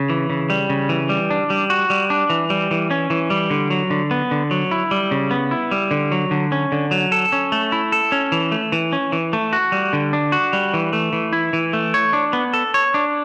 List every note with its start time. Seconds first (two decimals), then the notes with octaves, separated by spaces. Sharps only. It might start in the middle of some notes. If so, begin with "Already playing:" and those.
Already playing: C#3
0.10 E3
0.30 C#3
0.50 G3
0.69 C#3
0.89 E3
1.09 G3
1.30 D4
1.50 G3
1.70 F#4
1.90 G3
2.10 D4
2.30 E3
2.50 G3
2.71 E3
2.91 C#4
3.10 E3
3.30 G3
3.50 D3
3.70 F#3
3.90 D3
4.11 B3
4.31 D3
4.51 F#3
4.71 E4
4.91 G3
5.11 C#3
5.31 B3
5.51 E4
5.71 G3
5.91 D3
6.11 F#3
6.31 D3
6.52 C#4
6.72 D3
6.91 F#3
7.12 A4
7.32 C#4
7.52 A3
7.72 E4
7.92 A4
8.12 C#4
8.32 E3
8.52 A3
8.72 E3
8.93 C#4
9.12 E3
9.33 A3
9.53 F#4
9.72 G3
9.93 D3
10.13 D4
10.32 F#4
10.53 G3
10.74 E3
10.93 A3
11.13 E3
11.33 E4
11.53 E3
11.73 A3
11.94 C#5
12.13 D4
12.33 B3
12.54 A4
12.74 C#5
12.94 D4